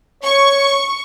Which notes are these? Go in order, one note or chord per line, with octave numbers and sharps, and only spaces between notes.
C#5 C#6